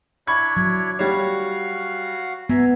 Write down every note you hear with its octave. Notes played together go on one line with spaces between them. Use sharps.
D4 E4 C#5 B5 C#6 G#6
F#3
G3 F#4 C#5 F5 F#5
B3 E5 G#5 A#5